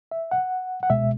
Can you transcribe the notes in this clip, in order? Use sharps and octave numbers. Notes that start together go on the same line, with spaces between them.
E5
F#5
F#5
C#2 B2 G#3 E5